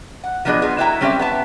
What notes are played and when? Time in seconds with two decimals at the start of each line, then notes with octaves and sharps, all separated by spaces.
0.24 F#5
0.45 F3 F#3 B3 D4 G#4 D#5
0.62 B3 F4 G#4
0.78 F#3 E4 A4 E5 G5 A#5
1.01 G3 C4 C#4 G4 B4 E5
1.19 B3 E5 A5